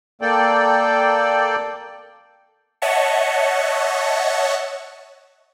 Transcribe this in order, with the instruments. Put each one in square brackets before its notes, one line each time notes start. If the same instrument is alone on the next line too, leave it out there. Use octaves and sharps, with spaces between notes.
[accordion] A#3 A4 D5 G5
[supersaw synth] C#5 D#5 E5 F#5 A5 C#6